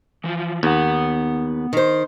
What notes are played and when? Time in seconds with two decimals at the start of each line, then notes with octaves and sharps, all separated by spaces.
0.24 E3 F3
0.63 D#2 B3 F#5
1.73 D#3 C5